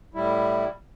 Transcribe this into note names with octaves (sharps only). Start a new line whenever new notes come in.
A2 G3 E4